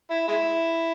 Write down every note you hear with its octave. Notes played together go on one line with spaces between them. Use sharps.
E4
G#3 E4